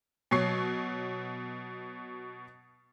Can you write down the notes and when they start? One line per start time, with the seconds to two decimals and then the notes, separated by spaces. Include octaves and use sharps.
0.31 B2 F#3 C#6 C7